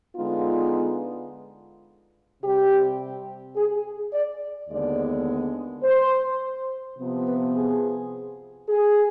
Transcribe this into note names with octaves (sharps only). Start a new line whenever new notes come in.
D3 G#3 B3 D#4 F4
C3 G3 C4 G4
G#4
D5
D#2 D3 G#3 B3 D5
C5
C3 F3 B3
B4
G#4
G#4